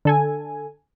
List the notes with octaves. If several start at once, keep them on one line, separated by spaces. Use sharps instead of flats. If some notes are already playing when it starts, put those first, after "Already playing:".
D3 A4 G#5